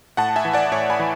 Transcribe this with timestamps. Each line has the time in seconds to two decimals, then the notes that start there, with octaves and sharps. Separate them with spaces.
0.17 A2 F#5 A5
0.36 E5 G#5
0.45 E3
0.53 D5 F#5
0.72 A2 C#5 E5
0.90 G#5 B5
0.99 E3